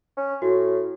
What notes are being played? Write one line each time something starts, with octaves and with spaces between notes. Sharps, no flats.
C#4
A2 F#4